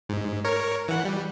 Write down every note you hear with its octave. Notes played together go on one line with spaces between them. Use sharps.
G#2
A#4 C#5
E3 F#5
G3